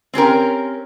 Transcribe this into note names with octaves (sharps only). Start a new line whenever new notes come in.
C4 C#4 G4 A#4